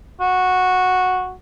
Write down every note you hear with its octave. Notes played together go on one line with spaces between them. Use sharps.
F#4